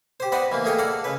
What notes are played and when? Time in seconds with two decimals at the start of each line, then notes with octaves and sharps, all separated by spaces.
0.20 G4 C5
0.32 B3 B4 C5 D5 D#5 F#5
0.52 E3 A#3
0.65 A3 A#3 G#4 A4 D#5 G5
0.78 A4 D5 F5 F#5 A5
1.04 C#3 B4